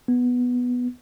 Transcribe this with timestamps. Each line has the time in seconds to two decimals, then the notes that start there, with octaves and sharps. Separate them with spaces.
0.08 B3